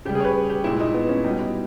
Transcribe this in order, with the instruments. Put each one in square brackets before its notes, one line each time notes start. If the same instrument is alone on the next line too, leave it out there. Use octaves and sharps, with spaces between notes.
[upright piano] C#3 G3 G4
G#4
C#5
B4
G4
A#2 G#3 E4
D#4
B3
C#4
B2 G3 D#4
E4